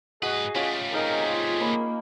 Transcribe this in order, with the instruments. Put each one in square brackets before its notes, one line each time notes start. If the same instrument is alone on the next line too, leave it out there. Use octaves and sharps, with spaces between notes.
[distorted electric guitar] G#2 B4 [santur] F#4 [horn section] G#4 D#5
[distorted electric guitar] G3 A3 [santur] C#4 F4
[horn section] C4 G#4 G#5 [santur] D#4 [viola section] A#4
[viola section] F4
[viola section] A#3 [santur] C#5 B5